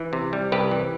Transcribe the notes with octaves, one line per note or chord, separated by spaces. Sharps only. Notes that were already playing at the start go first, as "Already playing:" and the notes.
Already playing: E3
C3
G3
C2 G4 B4
E3